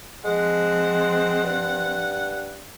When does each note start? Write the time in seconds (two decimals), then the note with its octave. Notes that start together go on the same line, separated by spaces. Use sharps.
0.25 F3 G#3 C4 F#5
1.43 G2